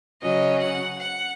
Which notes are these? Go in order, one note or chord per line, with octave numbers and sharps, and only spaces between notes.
C#3 F#3 C#4 D#5
F#5
F#5